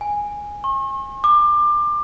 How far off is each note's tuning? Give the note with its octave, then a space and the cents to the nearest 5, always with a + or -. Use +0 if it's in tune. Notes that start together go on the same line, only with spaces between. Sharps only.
G#5 -10
C#6 -45
D6 +25